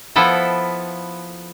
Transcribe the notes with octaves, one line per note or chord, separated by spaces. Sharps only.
F3 B3 E4 A4